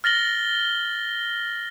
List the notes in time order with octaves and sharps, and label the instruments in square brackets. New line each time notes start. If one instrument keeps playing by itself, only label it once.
[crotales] F6 A6 A#6 F#7 G7